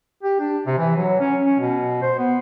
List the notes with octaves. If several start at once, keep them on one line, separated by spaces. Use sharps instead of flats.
G4
D4
C3
E3
F#3
C#4
C#4
B2
C5
B3